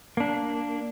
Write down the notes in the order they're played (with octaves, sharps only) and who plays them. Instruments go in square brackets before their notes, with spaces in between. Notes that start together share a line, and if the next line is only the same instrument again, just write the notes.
[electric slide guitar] A#3 D4